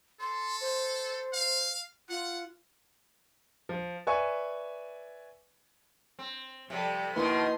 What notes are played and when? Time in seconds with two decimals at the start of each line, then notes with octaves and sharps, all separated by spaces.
0.20 A4 C6
0.61 C5
1.33 F5
2.09 F4 F#5
3.69 F3
4.07 B4 D5 E5 G#5 C#6
6.19 C4
6.70 C3 F3 G3 A4
7.16 D#2 B2 D#3 A#3 E4 B4 C6 D#6